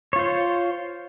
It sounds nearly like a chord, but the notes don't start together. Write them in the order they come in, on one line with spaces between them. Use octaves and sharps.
C#5 F4 C5